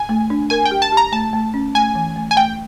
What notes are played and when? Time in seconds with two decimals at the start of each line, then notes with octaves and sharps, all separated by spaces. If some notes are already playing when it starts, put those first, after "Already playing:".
Already playing: G#5
0.09 A3
0.30 D4
0.50 A#4 G#5
0.65 G5
0.71 G4
0.82 A5
0.92 G4
0.97 A#5
1.12 A3 A5
1.33 A3
1.54 C#4
1.75 A3 G#5
1.95 E3
2.16 A3
2.31 G#5
2.36 A3 G5